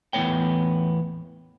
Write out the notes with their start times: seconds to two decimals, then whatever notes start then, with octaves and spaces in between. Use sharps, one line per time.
0.13 E2 A2 A#3 B3 C#5 G5